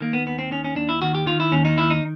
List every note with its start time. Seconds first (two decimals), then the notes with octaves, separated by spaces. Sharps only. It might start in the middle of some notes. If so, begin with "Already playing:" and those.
0.01 D#3 A#3
0.13 B3
0.26 D#2 B3
0.39 C4
0.51 D#3 C#4
0.64 C#4
0.76 D#2 D4
0.89 E4
1.02 D#3 F#4
1.15 G4
1.26 D#3 F4
1.40 E4
1.52 D#2 C#4
1.65 D#4
1.77 D#3 E4
1.90 D#4